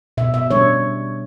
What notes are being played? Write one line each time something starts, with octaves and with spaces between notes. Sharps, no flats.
B2 E5
E5
G3 D4 C#5